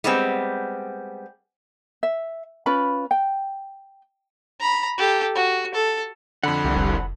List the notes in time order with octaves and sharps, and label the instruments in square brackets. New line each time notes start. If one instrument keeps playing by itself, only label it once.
[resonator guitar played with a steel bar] G3 G#3 B3 C4
[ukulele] E5
C#4 F4 B4 B5
G5
[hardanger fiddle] A#5 B5
G4 A4
F#4
A4
[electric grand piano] F2 D3 [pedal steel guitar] F#5 B5
[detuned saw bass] C2
[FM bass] F1